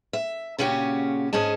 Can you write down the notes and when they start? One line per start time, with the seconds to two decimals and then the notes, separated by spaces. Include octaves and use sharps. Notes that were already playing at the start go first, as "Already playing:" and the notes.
0.13 E5
0.59 A#2 C#3 C#4 F#4 G4
1.33 G#2 C#4 G#4 D#5 A5